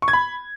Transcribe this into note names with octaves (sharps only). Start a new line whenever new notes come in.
C#6
G#6
B5